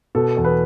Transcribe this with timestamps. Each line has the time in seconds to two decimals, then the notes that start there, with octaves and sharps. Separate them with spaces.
0.15 B2 A4
0.37 E2
0.44 B4